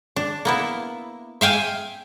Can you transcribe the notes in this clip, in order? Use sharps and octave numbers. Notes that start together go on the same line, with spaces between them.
D4
A#3 B3 E4
E5 F5 G5 G#5